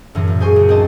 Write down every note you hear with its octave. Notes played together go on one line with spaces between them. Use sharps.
F#2 A2 E3
A#2
G#4 C5 G#5 C#6
C#2
C4 D#4 C5 C#5 D#5 A5